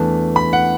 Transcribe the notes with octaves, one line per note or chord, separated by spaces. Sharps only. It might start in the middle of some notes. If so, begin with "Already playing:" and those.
Already playing: E2 E3 A3 D4
B5
F#5